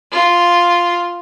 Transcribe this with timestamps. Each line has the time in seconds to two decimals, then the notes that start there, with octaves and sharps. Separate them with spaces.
0.12 F4